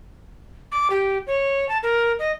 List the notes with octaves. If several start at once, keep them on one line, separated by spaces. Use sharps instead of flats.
D6
G4
C#5
A5
A#4
D#5